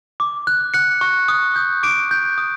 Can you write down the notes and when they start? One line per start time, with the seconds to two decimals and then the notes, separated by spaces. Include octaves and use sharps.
0.20 D6
0.47 F#6
0.74 F#6 C#7
1.01 C#6
1.28 D#6
1.56 G6
1.83 D6 D7
2.11 G6
2.38 D#6